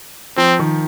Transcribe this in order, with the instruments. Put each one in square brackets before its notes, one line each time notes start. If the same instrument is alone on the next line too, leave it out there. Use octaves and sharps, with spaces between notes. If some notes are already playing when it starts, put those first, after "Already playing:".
[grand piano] F3 [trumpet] C4
[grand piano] D#3